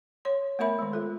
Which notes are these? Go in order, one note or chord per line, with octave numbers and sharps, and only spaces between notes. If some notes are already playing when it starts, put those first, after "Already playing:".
C#5 C6
A3 B3 A#4 E5 B5
D#3 G#3
F4 A4